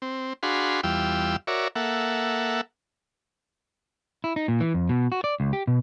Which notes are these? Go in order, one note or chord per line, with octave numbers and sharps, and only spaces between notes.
C4
D4 F#4 G#4 F5 B5 C6
E2 G3 F4 G5 E6
F#4 A#4 C#5 D5 E5
A#3 A4 E5 F#5
E4
D#4
A#2
E3
F2
B2
F#4
D5
C#2
G4
B2